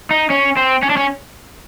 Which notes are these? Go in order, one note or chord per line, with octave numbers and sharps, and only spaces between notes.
D#4
C#4
C4
C#4
D4
C#4